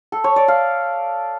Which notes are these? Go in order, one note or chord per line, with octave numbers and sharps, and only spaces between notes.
A4
C#5
D5
F5